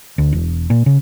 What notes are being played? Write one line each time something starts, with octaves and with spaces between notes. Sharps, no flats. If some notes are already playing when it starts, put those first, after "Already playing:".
D2
E1
A#2
C#3